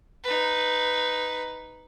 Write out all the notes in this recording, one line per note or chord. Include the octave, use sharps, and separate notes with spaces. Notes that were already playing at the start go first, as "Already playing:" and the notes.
D#4 B4